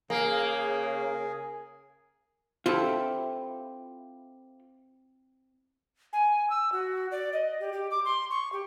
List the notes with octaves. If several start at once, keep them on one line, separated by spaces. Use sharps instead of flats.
C#3 A#3 G#4
C4 E4 F4 G4 A4
G#5
E6
F#4
D5
D#5
G4
G4
D6
C6
C#6
G4